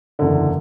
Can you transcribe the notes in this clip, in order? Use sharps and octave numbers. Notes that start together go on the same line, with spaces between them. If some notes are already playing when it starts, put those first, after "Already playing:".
F#1 E2 D3